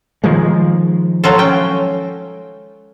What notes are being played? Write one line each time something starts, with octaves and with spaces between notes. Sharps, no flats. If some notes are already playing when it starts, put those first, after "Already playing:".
D#3 F3 G#3
F#3 F4 A4
C#4 G5